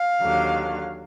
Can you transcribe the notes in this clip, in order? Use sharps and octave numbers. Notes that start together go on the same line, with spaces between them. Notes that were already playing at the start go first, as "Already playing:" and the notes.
Already playing: F5
D#2 D3 F#3